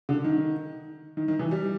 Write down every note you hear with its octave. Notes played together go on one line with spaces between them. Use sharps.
D3
D#3
D#3
D#3
E3
G3